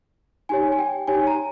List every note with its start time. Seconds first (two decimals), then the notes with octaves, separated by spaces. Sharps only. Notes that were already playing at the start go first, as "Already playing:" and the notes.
0.49 D#4 G4 C#5 G#5
0.72 G#5
0.79 G5
1.08 D#4 G4 C#5 G#5
1.27 A#5